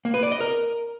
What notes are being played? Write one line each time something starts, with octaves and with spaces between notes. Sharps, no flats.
A#3
B4
D5
D#5
A#4